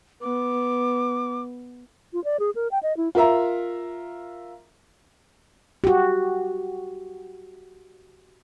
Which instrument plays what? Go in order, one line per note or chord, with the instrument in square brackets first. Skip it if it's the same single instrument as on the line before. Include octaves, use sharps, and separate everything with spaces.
[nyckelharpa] B3 [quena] D6
[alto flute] F4
D5
G#4
A#4
G5
D#5
E4
[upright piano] F4 A#4 E5 A#5
[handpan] F#4 G4